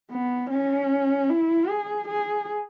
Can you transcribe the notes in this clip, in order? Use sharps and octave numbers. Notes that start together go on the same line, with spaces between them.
B3
C#4
E4
G#4
G#4